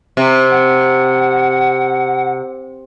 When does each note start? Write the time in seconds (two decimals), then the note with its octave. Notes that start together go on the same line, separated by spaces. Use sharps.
0.17 C3
0.50 F#5